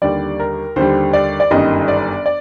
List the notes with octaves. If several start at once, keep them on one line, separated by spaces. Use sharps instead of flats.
D#2 D3 G3 D5
A#4
D#2 D3 G3 C5
D5
D5
G1 F#2 D#3 G3 D#5
D5
D5